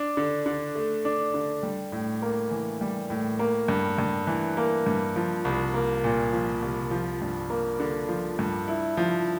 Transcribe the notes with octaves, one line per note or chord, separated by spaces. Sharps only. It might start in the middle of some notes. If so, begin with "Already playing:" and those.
Already playing: D4
D3
D3
A3
D4
D3
G3
A2
A#3
E3
G3
A2
A#3
G2
G2
E3
A#3
G2
F3
C2
A#3
A#2
F3
C2
F3
G2
A#3
D3
F3
G2
E4
F3